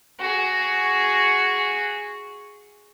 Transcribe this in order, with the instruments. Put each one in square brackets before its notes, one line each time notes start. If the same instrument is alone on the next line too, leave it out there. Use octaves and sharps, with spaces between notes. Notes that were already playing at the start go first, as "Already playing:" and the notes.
[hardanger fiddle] F#4 G#4